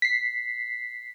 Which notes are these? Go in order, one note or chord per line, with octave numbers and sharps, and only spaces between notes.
B6 C7